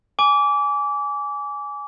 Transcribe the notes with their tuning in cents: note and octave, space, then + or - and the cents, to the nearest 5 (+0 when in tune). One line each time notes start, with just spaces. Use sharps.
G#5 +0 D6 -25